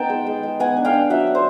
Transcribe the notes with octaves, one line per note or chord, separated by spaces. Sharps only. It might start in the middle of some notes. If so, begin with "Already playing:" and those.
Already playing: B3 D#4 G5 A5
G#3
G#3
G#3
B3 F#5 G#5
D4
F5 G5
D4
F#3 E5 F#5
D4
C5